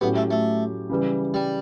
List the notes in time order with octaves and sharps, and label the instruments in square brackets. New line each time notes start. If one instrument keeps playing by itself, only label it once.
[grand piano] A2 F#3 C#4 G4 [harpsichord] B3
[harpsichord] A3
A3
[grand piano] C#3 E3 G3
[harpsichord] G3